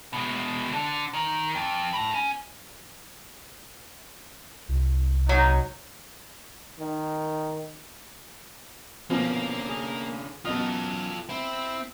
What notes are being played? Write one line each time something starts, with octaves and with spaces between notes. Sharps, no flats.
B2 G#3
D3
D#3
F2
A5 B5
C#4
C2
F#3 D#4
D#3
B2 D3 F3 A#3 C4 C#4
G#4
F#2 B2 F4 A4 D#5 D#6
C4 E4